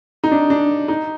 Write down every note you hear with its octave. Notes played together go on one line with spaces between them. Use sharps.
D#4
D4
D4
D#4